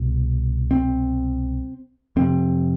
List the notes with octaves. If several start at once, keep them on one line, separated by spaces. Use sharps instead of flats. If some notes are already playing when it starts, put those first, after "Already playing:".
Already playing: C2 B2
C4
F2 C3 C4